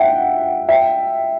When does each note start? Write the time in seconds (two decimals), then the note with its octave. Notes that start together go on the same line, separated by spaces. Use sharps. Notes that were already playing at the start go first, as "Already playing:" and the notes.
Already playing: E5 F#5 G5
0.69 E5 G5